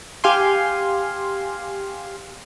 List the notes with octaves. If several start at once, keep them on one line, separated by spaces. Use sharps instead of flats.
G4 F5 G#5 C6